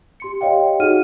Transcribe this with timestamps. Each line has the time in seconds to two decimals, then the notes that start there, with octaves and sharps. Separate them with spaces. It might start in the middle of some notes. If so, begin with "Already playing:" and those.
0.20 G4 C6 C#7
0.41 G4 C#5 D#5 F5 G5
0.80 D#4 F#4 G#4 F#5 F6 D#7